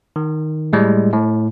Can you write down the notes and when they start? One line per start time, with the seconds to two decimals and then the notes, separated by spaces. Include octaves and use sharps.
0.16 D#3
0.73 A2 G3 G#3
1.13 A2